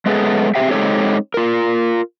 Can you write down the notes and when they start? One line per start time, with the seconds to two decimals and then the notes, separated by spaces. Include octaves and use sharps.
0.06 G#3 A3 B3 C#4 G#4 A4
0.55 C4 G4 G#4 E5 G5
0.71 G#3 C4 D#4 G4 A4 C#5
1.34 F4 A#4